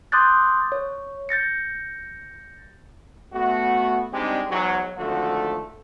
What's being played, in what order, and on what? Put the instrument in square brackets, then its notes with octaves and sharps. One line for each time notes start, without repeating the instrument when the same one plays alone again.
[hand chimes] C6 D6 D#6 F#6 G6 A6
C#5
G6 A6 A#6 C#7
[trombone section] A3 B3 F#4
G3 G#3 C4 D4 D#4 G4
E2 G#2 E3 F#3
G#1 D3 F3 A3 F#4 A4